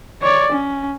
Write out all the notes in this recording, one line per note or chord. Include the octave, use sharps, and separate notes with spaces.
C#5 D5
C#4